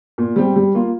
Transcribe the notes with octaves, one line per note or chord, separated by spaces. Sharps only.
A#2
G3 C4 G4
G3
A#3 F4